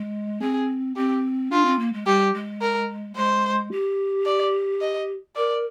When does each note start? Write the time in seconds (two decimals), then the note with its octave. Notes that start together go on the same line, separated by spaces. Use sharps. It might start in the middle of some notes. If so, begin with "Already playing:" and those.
Already playing: G#3
0.41 C4 G#4
0.96 C4 G4
1.51 D4 F4
1.65 C4
1.79 A#3
1.93 G#3
2.06 G3 G4
2.33 G#3
2.61 A#4
3.16 G#3 C5
3.71 G4
4.26 D5
4.81 D#5
5.36 A#4 D5